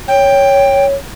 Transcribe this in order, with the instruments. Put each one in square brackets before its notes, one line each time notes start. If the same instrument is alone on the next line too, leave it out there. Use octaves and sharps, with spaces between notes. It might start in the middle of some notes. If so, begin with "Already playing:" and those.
[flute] C#5 [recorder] G5